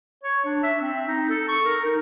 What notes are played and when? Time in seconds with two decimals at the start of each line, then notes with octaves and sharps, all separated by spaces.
0.23 C#5
0.45 D4
0.63 E5
0.81 C4
1.07 D#4
1.29 A4
1.48 C#6
1.65 A#4
1.85 D#4